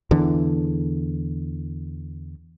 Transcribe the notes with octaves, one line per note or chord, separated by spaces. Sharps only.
E2 D3 E3